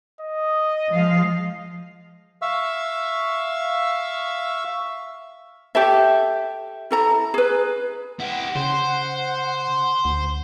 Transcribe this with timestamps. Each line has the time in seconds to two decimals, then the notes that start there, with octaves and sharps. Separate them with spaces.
0.21 D#5
0.91 F3 G#3 F5
2.42 E5 F5 C#6 E6
5.75 G4 A4 E5
6.91 E4 A4 A#5
7.34 G#4 B4
8.20 E4 G4 F#5
8.56 C#3 C5
10.05 D2